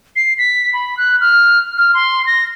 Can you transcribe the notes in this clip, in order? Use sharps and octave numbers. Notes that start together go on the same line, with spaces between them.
C7
B6
B5
F#6
F6
F6
C6
A#6